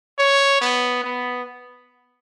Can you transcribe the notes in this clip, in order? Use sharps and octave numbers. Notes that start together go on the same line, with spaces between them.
C#5
B3
B3